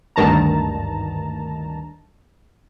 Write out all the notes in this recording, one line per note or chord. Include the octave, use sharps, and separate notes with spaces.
G#1 D2 G2 D#3 A5 A#5